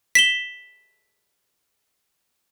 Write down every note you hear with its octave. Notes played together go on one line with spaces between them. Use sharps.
B6 E7 G7